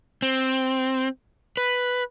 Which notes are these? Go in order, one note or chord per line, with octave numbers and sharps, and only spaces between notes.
C4
B4